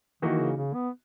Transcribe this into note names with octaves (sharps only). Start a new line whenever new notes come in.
D#3 E3 A#3 D#4 F#4
C#3
C#3
B3